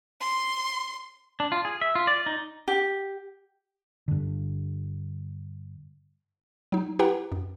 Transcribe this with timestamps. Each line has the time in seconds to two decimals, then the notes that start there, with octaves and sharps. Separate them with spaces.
0.21 C6
1.40 D4
1.52 F4
1.65 G#4
1.81 E5
1.95 F4
2.07 D5
2.26 D#4
2.68 G4
4.08 G2 D3
6.72 F#3 D#4
6.99 E4 G4 B4 F#5 G5 A#5
7.32 F#2